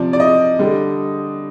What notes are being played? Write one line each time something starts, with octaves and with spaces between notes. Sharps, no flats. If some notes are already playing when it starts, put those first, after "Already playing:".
Already playing: C3 F3 D5
D5
D#5
D3 G3